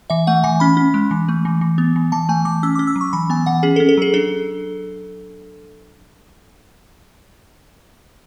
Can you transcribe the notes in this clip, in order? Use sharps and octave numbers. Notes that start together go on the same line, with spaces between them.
E3 E5
A3 F#5
E3 G#5
C#4 B5
C#4
G#3
E3
A3
E3
E3
B3
E3
E3 A5
A3 G#5
E3 D6
C#4 E6
C#4 D6
E6
F#3
C#6
E3 B5
B3 G#5
E3 F#5
C#4 G#4
A4
C#4
A4
F#3 G#4
D4 A4